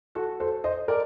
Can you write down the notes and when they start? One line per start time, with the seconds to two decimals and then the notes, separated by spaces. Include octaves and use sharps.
0.15 F#4 A4
0.40 A4 C5
0.64 C5 D#5
0.88 A#4 D5